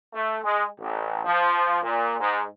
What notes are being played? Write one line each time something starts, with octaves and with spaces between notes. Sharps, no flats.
A3
G#3
A1
F3
A#2
G#2